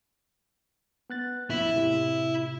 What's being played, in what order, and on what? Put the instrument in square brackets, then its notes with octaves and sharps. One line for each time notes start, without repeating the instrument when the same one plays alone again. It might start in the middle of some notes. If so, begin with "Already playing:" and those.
[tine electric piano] B3 F#6 A6
[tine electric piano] A#1 E2 [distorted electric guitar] E4
[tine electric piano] A2 C3